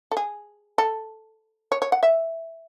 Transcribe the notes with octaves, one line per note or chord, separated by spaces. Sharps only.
A4
G#4
A4
C#5
C#5
F#5
E5